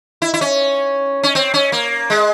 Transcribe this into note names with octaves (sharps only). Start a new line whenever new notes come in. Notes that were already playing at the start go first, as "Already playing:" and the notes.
E4
E4
C#4
C#4
C4
C#4
A#3
G#3